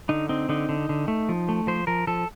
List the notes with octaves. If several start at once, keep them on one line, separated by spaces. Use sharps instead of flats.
D3 D#4
C4 D#4
D3 D#4
D3
D3
A3
F3
A3
F3 C5
F3 A#4
F3 A4